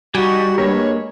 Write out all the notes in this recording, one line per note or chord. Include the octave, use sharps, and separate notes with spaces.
G3 D#4 F#4 G#5
G2 G#3 A#3 A#4 C#5